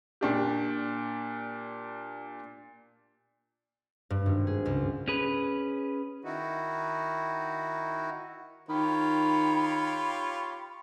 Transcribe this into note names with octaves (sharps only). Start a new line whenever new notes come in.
A#2 D4 G4
G2
G#1
G#4
C#2
C#4 G#4 B4
D#3 D#4 E4 F#4
D#3 F4 G4 C#5 B5